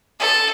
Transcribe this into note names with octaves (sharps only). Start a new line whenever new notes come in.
A4